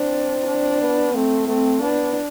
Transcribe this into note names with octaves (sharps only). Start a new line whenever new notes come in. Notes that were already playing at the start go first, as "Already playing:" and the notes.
Already playing: C4 D4
D4
B3
A3 C4
A3 C4
B3 D4